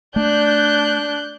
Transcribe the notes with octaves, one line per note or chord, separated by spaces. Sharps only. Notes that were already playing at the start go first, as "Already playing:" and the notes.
A3 D4 F#6 G6